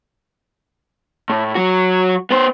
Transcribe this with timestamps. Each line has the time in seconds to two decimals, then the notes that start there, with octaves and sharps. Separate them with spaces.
1.30 A2
1.55 F#3 F#4
2.31 B3 C5